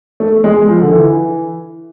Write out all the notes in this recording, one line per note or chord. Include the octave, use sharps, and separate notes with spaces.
A3
G#3
F3
D3
E3